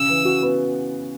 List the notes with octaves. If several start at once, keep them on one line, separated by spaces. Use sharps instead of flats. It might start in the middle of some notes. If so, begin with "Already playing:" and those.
Already playing: C#3 E6
E3
F#4
B3